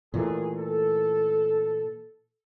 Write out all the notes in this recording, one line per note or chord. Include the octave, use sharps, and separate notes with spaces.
D#2 A#2 E3 A3 G#4
A4